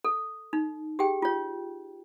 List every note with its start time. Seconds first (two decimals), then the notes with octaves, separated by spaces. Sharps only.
0.04 A4
0.53 D#4
0.99 G4 G#4 G5
1.22 F4 C#5